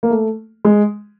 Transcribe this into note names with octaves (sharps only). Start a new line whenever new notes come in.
A#3
A3
G#3